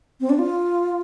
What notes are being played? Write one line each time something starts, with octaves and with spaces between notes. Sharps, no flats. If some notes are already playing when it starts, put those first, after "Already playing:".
C4
D4
F4